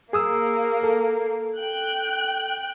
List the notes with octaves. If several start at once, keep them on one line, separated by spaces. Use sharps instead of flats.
A#3 G#4 D#6 E6
A4
G5 F#6